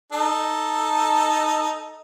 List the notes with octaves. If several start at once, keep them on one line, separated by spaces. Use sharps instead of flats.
D#4 A4